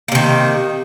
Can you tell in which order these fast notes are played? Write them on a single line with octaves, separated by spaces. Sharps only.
A#3 C3 D#3